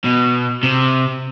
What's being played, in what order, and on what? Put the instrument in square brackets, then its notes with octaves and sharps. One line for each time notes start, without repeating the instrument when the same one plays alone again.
[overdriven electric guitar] B2
C3